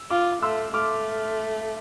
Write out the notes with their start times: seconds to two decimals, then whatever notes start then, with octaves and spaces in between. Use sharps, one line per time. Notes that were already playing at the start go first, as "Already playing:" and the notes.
Already playing: E6
0.10 F4 D6 F6
0.42 A3 C6 E6
0.73 A3 D6 F6